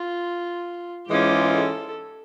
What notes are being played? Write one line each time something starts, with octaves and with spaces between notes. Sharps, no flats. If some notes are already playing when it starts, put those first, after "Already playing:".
Already playing: F4
G#2 E3 G#3 C#4 F4 G4
A4